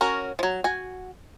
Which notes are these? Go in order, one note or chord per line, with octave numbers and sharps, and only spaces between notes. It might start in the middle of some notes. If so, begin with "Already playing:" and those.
C#4 F#4 A#4
F3 F#3
F#4 G#5